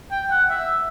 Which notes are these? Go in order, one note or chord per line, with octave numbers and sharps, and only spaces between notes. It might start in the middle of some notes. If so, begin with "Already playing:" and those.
G5
F#5
E5